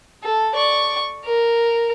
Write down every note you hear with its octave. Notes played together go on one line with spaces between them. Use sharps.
A4
D5 C#6
A#4